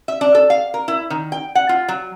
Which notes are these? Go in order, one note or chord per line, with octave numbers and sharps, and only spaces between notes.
E5
D4
A4
F5
A#4
E4
D#3
G5
F#5
F4
F#3